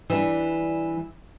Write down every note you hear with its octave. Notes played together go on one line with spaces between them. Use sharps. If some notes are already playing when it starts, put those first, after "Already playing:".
E3 G3 D4